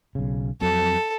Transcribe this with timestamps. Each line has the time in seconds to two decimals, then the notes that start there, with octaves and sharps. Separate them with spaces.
0.15 B1 C#3
0.61 F2 F#3 C4 A4